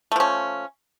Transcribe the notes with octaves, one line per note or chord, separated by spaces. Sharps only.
F3 A3 C#4